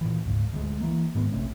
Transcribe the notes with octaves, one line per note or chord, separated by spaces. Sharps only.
A#2 E3
D2 G#2 C#3
D2 G#3
E3 A#3
G#2 D#3 G#3 B3
A#1 C3 A3 C#4